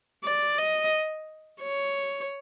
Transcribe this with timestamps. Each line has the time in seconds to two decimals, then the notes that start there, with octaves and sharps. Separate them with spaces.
0.24 D5
0.58 D#5
1.62 C#5